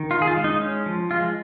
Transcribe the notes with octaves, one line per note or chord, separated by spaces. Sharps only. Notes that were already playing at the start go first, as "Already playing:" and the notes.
Already playing: D#3
D#4 F4
G#4
F4
G#3
D#4
C#4
F3
G#3 F4